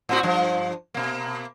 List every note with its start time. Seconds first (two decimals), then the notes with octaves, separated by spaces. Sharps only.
0.09 A2 C4 F#4
0.23 G2 F3
0.94 B2 A#3